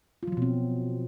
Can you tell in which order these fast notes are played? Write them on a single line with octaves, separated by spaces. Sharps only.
F4 F#3 F3 B2 C4